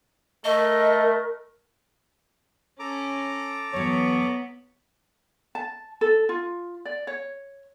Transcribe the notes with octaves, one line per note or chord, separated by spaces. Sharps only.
A3 A#4 D#5
C#4 A4 A#5 D6
E2 F#3 B3 C#5
A5
A4
F4
D5
C#5